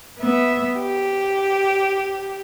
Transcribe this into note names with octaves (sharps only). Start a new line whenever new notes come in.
B3 E5
G4